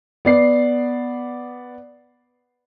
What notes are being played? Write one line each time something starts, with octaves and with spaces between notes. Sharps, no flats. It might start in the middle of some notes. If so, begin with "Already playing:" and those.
B3 D5 C7